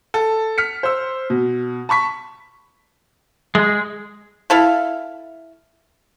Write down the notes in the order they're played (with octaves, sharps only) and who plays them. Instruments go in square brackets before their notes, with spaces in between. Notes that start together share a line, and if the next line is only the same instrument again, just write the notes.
[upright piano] A4
F6 B6 C#7
C5 E6
B2
A5 B5 C#6 B6
[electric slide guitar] G#3
[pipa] E4 A4 E5 F5